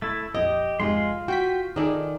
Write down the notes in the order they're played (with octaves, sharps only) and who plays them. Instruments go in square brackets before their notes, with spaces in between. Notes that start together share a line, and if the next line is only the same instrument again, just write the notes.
[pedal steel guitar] A3 E4 [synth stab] A6
[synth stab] A#1 F2 [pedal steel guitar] G4 [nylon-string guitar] D#5
[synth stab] F2 G#2 C3 [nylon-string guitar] G#3 [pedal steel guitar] F4 C6
[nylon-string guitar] F#4 [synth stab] G5 G6 B6
[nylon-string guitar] D#3 D5 [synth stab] D#4 G#4 A4